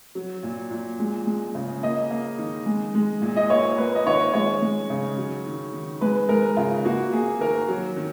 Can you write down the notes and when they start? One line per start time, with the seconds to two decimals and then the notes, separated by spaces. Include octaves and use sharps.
0.15 F#3
0.43 A#2
0.71 A#2
0.99 G#3
1.27 G#3
1.55 C#3
1.83 A#3 D#5
2.11 A#3
2.38 D#3
2.66 G#3
2.95 G#3
3.22 A#2
3.36 D#5
3.50 A#3 C#5
3.78 A#3 B4
3.95 D#5
4.06 D#3 C#5
4.33 G#3 C#5
4.62 G#3
4.90 C#3
5.17 F#3
5.46 D#3
5.73 D#3
6.01 G#3 B4
6.29 G#3 A#4
6.57 C#3 F4
6.85 A#3 F#4
7.12 A#3 G#4
7.40 D#3 A#4
7.69 F#3
7.97 D#3